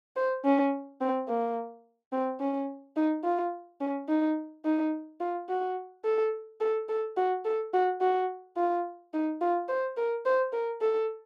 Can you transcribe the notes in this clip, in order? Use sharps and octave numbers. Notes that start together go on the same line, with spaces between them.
C5
C#4
C4
A#3
C4
C#4
D#4
F4
C#4
D#4
D#4
F4
F#4
A4
A4
A4
F#4
A4
F#4
F#4
F4
D#4
F4
C5
A#4
C5
A#4
A4